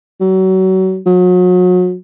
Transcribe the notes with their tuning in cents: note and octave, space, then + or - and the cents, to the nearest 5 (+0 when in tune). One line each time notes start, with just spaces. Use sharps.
F#3 +30
F#3 -35